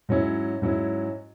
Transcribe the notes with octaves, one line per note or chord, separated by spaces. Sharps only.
G#2 F#3 C#4 E4
G#2 F#3 C#4 E4